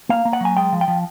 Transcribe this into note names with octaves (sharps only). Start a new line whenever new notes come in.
A#3 F5
A#3
F#5
F#3 G#5
G#3 G5
F3
G5
F3